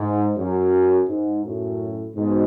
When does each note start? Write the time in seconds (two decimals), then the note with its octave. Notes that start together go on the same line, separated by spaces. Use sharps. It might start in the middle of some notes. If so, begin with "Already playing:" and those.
Already playing: G#2
0.37 F#2
1.08 G#2
1.44 F#2 A2
2.15 G#2 B2